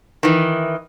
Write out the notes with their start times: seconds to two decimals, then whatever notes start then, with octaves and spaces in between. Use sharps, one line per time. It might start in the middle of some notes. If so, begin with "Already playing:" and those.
0.23 D#3 E3